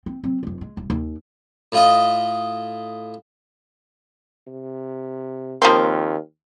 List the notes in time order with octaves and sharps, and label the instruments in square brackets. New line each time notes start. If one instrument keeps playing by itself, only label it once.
[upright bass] C4
F#3 C4
F1 F#2
G#3
D#1
D#2
[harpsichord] A2 F4 D#5
[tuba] C3
[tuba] D#2 [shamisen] F3 A#3 C4